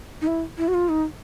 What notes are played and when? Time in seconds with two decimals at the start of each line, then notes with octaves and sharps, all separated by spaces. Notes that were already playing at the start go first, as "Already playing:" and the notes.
0.22 D#4
0.27 E4
0.58 E4
0.68 F#4
0.74 F4
0.89 D#4